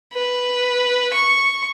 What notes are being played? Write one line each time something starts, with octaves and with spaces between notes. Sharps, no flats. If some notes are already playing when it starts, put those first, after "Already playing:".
B4
C#6